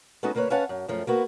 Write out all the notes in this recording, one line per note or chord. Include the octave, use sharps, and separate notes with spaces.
G#3 B3 C#4 D#4 F#4 A4
D2 A#3 B3 B4 C#5
C#4 B4 C#5 F5 F#5 A5
F#2
F#2 F3 A3
A#3 B3 F#4